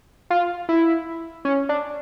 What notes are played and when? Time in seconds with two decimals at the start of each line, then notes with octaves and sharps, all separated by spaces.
0.30 F4
0.69 E4
1.45 C#4
1.69 D4